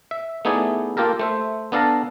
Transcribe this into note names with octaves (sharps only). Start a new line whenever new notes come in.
E5
A3 B3 D#4 E4 G#4 D5
A#3 F4 G4 A4 A#4
A3 C5 E5
B3 D4 A4 F5 A5 A#5